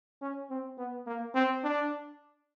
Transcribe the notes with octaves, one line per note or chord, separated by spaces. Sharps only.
C#4
C4
B3
A#3
C4
D4